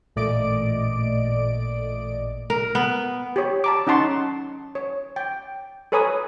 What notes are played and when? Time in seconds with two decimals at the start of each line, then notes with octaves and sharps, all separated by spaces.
0.16 A1 A#2 A3 D5 D#5 D7
2.50 A#4
2.75 B3
3.36 G4 C#5
3.64 A5 A#5 D6
3.87 C#4 D#4 F#5 A5 C6 C#6
4.75 C#5
5.16 G5
5.92 A4 B4 C#5 G#5 A#5 D#6